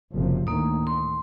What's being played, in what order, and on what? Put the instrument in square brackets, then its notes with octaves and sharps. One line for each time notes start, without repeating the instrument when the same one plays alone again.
[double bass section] F#1 C3 F3
[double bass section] D2 A2 D#3 [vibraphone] A#3 D#6
[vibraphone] C6